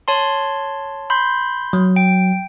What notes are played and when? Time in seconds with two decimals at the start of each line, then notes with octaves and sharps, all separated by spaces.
0.08 C#5 A5 C6
1.10 B5 C6 G6
1.73 F#3
1.96 G5 D7